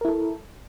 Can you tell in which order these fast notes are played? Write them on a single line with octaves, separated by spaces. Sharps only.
A#4 E4 A4